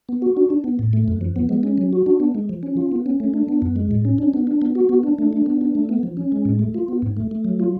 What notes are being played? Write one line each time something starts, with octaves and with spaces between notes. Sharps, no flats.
B3
F#4
D4
D4
B3
A2
A3
F#2
F3
B3
G#3
C#4
F#3
F#4
D4
B3
G#3
F3
C#4
F4
B3
C#4
A3
D4
B3
F#2
G#3
A2
C#4
D4
B3
D4
B3
F#4
B3
D4
A3
D4
B3
D4
A3
B3
F3
C#4
G#3
A2
A3
F4
B3
G#2
A3
A3
F#3
F4